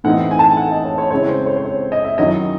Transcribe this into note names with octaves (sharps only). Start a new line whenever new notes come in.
A2 E3 C4 D#4 F#5
G#5
A5
G#5
F#5
D#5
C#5
C#5
C#3 G#3 C4 E4 C#5
C5
C#5
C5
C#5
D#5
E5
D#3 F#3 C#4 E4 D#5